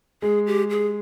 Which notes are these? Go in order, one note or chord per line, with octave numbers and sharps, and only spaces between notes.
G#3 G#4
G4
G#4